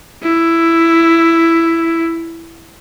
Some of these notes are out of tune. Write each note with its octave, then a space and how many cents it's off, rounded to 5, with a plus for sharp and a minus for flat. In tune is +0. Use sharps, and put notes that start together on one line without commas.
E4 +10